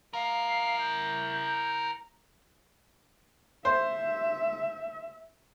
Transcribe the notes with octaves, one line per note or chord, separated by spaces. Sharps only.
E4 A#4 F5
G6
C5 E5